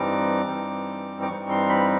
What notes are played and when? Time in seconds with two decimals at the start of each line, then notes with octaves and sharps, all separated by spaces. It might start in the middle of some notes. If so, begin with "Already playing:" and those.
Already playing: G2 E3 G3 C4 D#4 D6
0.46 G2 E3 G3 C4 D#4
1.22 D6
1.28 G2 E3 G3 C4 D#4 C#6
1.50 C6
1.69 B5